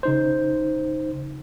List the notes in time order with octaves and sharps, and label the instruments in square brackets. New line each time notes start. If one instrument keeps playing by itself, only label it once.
[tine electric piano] C#3 D#4 C5